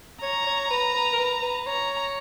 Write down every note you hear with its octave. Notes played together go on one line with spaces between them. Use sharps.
C#5 A#5
C#5
B4
B4
A#4
B4
B4
C#5 A#5